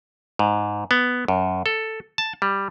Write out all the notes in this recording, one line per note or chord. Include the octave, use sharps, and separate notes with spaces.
G#2
B3
F#2
A4
A5
G3